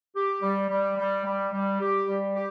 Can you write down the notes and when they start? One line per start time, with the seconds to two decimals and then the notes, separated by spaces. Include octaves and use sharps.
0.15 G4
0.42 G3
0.69 G3
0.98 G3
1.25 G3
1.52 G3
1.80 G4
2.08 G3
2.35 G4